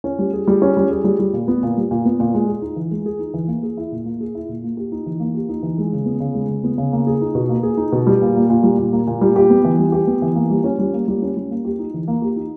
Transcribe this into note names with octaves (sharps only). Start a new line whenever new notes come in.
C#4
G3
G#4
G3
C#4
G3
G#4
G3
G3
A#2
B3
A#2
G3
A#2
B3
A#2
G#3
G#4
D#4
E3
G#3
G#4
D#4
E3
A#3
G#4
E4
A#2
A#3
G#4
E4
A#2
A#3
G4
D#4
E3
A#3
G4
D#4
E3
G#3
C#3
B3
C#3
G#3
C#3
B3
C#3
A#3
G#4
D#4
B2
A#3
G#4
D#4
B2
G3
A#2
A#3
A#2
G3
A#2
A#3
A#2
G3
G4
B3
E3
G3
G4
B3
E3
A#3
G3
C#4
G3
A#3
G3
C#4
G3
A#3
G4
D#4
E3
A#3
G4
D#4